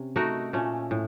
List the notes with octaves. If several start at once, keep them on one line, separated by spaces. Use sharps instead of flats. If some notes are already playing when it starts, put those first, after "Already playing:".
Already playing: C3 C#4
A3 D#4 F#4 A#4
A#2 A3 C#4
A2